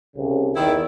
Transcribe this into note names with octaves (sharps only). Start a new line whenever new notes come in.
C2 C#3
E2 D#3 E4